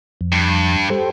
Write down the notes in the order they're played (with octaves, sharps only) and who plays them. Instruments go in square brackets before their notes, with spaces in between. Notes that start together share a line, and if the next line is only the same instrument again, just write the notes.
[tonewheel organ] F2
[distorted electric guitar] G2
[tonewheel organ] G4 A4 C5